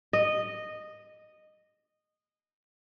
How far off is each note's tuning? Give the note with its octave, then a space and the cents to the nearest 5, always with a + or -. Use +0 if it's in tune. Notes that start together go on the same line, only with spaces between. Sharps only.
D#5 -10